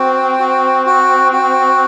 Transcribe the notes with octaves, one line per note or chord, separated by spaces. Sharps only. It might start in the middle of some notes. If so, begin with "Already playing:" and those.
Already playing: C4 F#4
F#4
F#4
F#4